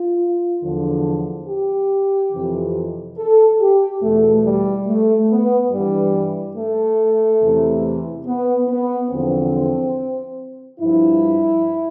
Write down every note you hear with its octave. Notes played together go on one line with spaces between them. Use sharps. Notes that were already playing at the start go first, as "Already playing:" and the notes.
Already playing: F4
E2 D3 F3
G4
F2 C3 E3
A4
G4
E2 B2 A3
G3
A3
B3
G2 E3 G3
A3
E2 C3 E3
B3
B3
E2 D3 F3 C4
G2 F3 E4